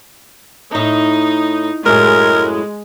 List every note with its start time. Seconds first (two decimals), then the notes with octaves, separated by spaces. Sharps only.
0.75 A2 D#4
1.86 F#2 A2 G#3 A#4